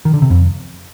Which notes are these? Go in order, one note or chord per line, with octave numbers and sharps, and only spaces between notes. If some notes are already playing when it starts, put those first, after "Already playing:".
D#3
D3
C3
F2